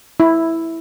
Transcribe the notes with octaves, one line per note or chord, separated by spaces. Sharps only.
E4